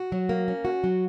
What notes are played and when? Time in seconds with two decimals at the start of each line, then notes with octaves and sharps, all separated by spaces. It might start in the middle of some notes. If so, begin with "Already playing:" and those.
Already playing: F#4
0.12 F#3
0.29 A#3
0.48 C#4
0.65 F#4
0.84 F#3